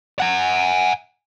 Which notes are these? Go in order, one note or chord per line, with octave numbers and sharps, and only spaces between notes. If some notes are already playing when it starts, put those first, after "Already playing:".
F#5 G#5